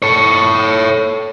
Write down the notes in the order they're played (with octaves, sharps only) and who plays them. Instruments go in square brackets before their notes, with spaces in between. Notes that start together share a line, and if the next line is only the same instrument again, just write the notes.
[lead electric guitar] A4 C#5